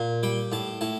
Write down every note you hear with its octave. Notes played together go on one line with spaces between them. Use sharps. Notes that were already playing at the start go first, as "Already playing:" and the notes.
Already playing: A#2
G3 G5
A2 A5
A2 A5